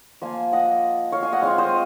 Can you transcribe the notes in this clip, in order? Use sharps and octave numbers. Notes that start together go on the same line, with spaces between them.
F3 A#3 F4 F5 G#5
D#5 F#5
C#5 F5
F5 G#5
D#5 F#5
G#3 C4 F4 C#5 F5
C5 D#5